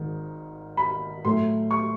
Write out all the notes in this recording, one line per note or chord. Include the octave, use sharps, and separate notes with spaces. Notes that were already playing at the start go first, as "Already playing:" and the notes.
Already playing: G#1 G#2 D#3
B5
A2 F#3 A3 C6
C#6